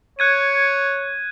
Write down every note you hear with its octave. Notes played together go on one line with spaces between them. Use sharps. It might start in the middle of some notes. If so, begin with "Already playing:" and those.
C#5 F#6 G#6 D#7